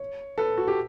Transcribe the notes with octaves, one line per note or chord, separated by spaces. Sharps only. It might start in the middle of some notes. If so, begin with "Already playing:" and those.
Already playing: C#5
A4 B4
F#4
G4